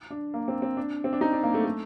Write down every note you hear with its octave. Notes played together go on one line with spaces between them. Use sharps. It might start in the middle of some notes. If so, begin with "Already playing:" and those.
D4
A#3
C4
C4
D4
C4
D4
D#4
D4
A#3
A3
A3